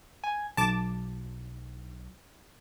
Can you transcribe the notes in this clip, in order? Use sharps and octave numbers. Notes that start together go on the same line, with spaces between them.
G#5
B1 A5 D6